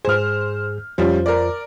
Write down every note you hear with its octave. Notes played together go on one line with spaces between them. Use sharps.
G#2 G#4 C5 F6
F2 F3 G3 C#4 F4 C5
A#4 D5